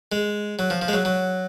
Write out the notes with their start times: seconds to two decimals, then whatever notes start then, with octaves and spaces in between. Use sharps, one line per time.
0.12 G#3
0.59 F#3
0.70 F3
0.82 F3
0.88 G#3
0.93 F#3
1.05 F#3